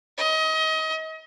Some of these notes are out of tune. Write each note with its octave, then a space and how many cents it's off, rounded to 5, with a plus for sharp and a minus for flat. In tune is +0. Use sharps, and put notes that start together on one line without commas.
D#5 +30